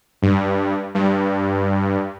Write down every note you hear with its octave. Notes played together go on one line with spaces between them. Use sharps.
G2
G2